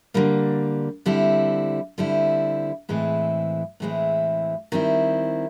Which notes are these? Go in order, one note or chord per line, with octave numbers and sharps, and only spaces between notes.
D3 G3 A#3
D3 G3 C4 E4
D3 G3 C4 E4
A2 E3 G#3 C4 E4
A2 E3 G#3 C4 E4
D#3 G3 C4 E4